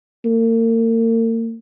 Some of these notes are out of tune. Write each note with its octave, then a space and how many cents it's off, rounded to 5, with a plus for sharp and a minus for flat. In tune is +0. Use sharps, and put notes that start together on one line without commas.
A#3 -40